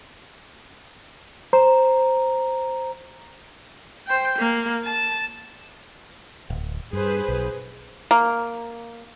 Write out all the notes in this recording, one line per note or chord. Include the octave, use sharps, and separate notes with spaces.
C5 A#5
C5 G5
A#3
A5
D1
G2 G#4 B4 C5
B1
A#3